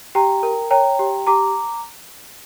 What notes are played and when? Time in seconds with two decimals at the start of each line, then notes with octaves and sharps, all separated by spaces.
0.15 G4 G5 A#5
0.43 A#4
0.71 C#5 G5 A#5
0.99 G4
1.27 G4 A#5 D6